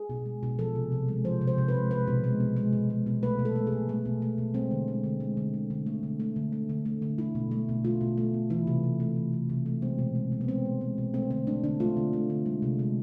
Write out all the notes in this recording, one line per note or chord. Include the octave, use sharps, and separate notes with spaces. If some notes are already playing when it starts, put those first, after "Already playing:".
Already playing: G#4
B2
G#3
B2
F3 A4
C3
C3
G#3
F3 C5
C3
C5
C3
B4
G#3
G#3 B4
B2
G#3
B2
G#3
B2
G#3
B2
A3 B4
B2
A4
A3
G#4
B2
A3
B2
A3
B2
G#3 C4
D3
G#3
D3
G#3
D3
G#3
D3
A3
D3
A3
D3
A3
D3
A3
D3
A3 E4
B2
A3
B2
A3 F4
B2
A3
B2
E3 E4
C3
C3
A3
E3
C3
C3
A3
G#3 C4
B2
G#3
B2
B3
G#3 C4
B2
G#3
B2
A3 C4
D3 C4
A3 D4
D3 D4
A3 F4
D3
A3
D3
G#3
C3
G#3